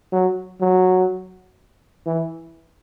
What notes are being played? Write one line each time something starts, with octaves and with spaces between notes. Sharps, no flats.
F#3
F#3
E3